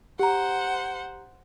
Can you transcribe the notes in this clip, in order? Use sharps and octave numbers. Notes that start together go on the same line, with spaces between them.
G4 C5 F#5 A#5